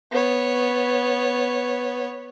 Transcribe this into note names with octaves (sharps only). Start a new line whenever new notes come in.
B3 C#5